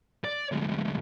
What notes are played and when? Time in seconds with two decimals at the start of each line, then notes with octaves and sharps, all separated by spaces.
0.24 D5
0.52 D2 G#2